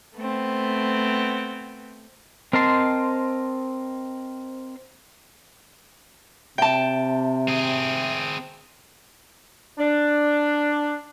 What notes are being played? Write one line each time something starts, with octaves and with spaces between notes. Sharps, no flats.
A3 B3 C4
C4 A#4 D#5 A5 C6
C3 E5 G5 A5
C4 G#4
D4